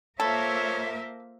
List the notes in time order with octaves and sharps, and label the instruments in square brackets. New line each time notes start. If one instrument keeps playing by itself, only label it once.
[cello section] A#3 A#4 E5 [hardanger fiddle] F4 C5 [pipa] A4 [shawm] C#5